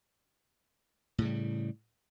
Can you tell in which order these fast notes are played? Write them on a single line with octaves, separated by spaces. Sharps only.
A2 C#3 G3